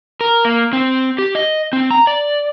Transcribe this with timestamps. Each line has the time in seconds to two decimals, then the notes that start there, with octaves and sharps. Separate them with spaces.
0.21 A#4
0.45 A#3
0.73 C4
1.18 G4
1.35 D#5
1.73 C4
1.91 A#5
2.07 D5